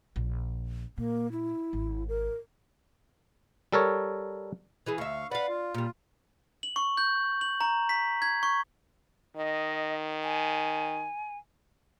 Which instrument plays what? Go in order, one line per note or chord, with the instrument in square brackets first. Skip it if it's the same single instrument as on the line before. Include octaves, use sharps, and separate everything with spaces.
[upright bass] A#1
[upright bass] A#2 [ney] A#3
[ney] E4
[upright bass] G#1
[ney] A#4
[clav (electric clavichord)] G3 A4 A#4 C#5
[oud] E3 E4 G#4
[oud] D2 E5 [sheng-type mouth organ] F5 C#6
[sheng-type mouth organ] B4 F#5 B5 [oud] D5 F5
[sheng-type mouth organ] F4
[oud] A#2 G3
[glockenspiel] F#7
C#6
G6
F#7
A#5
B6
G#6
C#6
[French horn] D#3 [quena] D#5
[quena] G#5